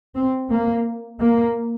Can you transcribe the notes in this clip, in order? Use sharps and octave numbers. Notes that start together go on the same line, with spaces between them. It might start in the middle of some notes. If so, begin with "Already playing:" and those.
C4
A#3
A#3